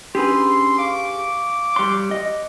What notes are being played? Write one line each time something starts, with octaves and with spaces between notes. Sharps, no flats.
C#4 D4 G4 G#4 B4 C6 E6
F5 C#6 D6
G3 C#5 C6 F#6 C#7
D#5